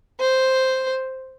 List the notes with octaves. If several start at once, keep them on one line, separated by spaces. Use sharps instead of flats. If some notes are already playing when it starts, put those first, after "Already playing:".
C5